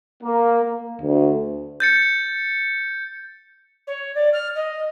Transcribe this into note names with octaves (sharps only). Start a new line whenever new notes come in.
A#3
D2
G6 A6 C#7
C#5
D5
F6
D#5